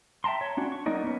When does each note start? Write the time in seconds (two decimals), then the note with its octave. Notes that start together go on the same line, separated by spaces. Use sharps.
0.24 E5 G5 A5 A#5 C6
0.41 C#5
0.57 C#4 D4 F#4
0.72 C#6
0.86 F#3 A#3 D#4 A#4 D5
1.04 B3 C#4